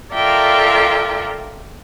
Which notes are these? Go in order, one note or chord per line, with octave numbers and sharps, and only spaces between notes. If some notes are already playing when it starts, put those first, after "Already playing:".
F4 A4 A#4 D5 E5 G5